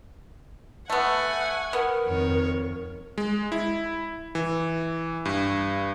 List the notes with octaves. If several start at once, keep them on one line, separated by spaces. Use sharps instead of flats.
A3 B3 F#5 G#5
B3 A#4
F2 D#3 C#5
G#3
E4
E3
G2